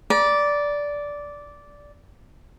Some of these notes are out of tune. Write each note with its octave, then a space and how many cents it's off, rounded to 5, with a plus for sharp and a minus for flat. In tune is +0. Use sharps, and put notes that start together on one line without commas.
D5 -10 A#5 +45